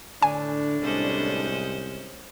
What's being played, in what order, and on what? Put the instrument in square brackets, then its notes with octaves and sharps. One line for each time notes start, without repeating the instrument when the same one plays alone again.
[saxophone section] A2 D4 [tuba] D3 [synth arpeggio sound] G#5
[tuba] C2 [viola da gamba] G#3 C#4 C5